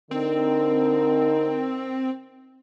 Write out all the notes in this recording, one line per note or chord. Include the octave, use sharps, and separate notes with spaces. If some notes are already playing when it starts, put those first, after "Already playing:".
D3 C4 D#4 A#4